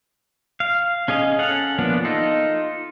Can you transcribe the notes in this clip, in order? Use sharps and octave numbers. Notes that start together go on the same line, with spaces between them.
F5
C#4 G#4 D#5 F5
C#4 A4 F5 F#5
E3 F3 A#3 B3 D4
D#4 F4 A4